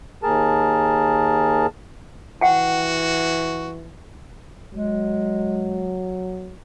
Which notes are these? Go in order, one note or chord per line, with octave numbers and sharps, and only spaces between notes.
D#2 G#4 A#4 A5
E3 F#4 F#5 G5
F#3 G#3